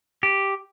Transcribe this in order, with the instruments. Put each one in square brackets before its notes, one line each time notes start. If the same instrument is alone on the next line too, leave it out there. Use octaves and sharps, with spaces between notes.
[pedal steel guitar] G4